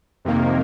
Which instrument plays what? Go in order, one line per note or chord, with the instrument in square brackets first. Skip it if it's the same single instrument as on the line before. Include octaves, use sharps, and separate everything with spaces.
[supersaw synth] F2 C3 D#3 A#3